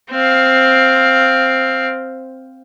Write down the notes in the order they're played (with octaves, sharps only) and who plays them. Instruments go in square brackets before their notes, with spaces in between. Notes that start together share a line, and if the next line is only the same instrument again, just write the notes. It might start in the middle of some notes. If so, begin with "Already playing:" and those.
[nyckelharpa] C4 F5